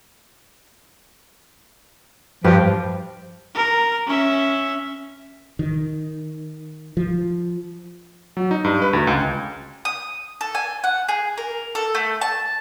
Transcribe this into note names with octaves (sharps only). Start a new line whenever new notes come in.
G2 F3 G4 B4
A#4
C#4 E5
D#3
F3
F#3
D#4
G2
B4
D2
C#2
D#6
A4
G#5
F#5
G#4
A#4
A4
A3
A5